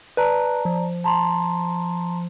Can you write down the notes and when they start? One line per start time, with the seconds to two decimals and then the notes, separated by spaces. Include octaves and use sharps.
0.17 B4 D5 A5 A#5
0.65 F3
1.04 A5 A#5 C6